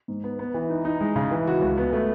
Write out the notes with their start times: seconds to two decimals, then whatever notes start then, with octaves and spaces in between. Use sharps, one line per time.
0.08 G#2
0.24 B3
0.39 B3
0.54 E3
0.70 D#4
0.85 D#4
1.00 G#3
1.16 C#3
1.31 E3
1.47 F#4
1.62 C#2
1.78 B3
1.93 A3